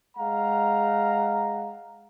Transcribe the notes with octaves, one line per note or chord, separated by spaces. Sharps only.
G#3 F5 F#5 A#5